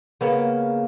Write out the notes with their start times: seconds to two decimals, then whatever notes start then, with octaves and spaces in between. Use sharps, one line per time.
0.21 C#3 A#3 B3